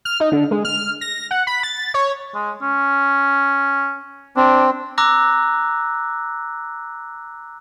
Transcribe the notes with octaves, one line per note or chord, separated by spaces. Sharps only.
F6
D#4
D3
G#3
F6
A#6
F#5
B5
A6
C#5
G#3
C#4
C4 D4
A#5 D6 E6 F#6 A#6